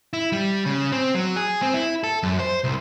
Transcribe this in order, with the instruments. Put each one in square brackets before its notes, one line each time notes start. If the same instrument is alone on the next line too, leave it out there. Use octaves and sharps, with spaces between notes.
[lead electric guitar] E4
G3
C#3
C4
F#3
G#4
C4
E4
A4
F#2
C5
C2